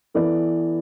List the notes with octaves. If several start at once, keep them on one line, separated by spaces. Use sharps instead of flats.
E3 B3 E4 A4 D5